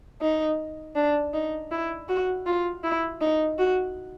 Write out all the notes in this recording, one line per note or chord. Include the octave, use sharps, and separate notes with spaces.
D#4
D4
D#4
E4
F#4
F4
E4
D#4
F#4